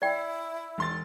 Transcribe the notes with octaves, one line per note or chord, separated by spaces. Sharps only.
E4 D5 G5
E1 C6 A6